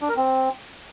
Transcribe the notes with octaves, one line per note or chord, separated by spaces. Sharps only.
D4
A#4
C4